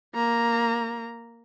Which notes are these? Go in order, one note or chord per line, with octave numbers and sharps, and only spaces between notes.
A#3 A#5